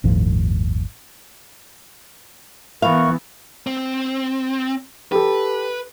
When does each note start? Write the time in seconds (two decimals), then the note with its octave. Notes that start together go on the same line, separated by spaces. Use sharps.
0.04 G1 D#2 A2 F3
2.82 E3 B3 A#4 F5 B5 C#6
3.67 C4
5.12 G4 A4 B4